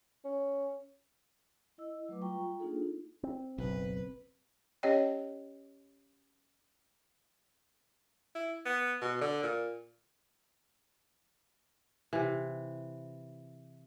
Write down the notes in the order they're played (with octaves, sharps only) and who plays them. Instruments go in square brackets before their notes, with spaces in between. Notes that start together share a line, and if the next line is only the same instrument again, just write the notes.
[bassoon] C#4
[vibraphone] E4 D#5 E6
F#3 A3 B4 D6
G3 F4 G5 A#5 C#6
A#3 D4 D#4 F4 G#4 A4
D#4
[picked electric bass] C4
[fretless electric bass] F#1 B1 [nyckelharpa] B4
[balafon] C#4 G4 C#5 D#5 G5
[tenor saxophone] E4
B3
B2
D3
A#2
[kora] C3 E3